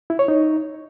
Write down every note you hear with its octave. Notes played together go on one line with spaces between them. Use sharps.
E4
C#5
D#4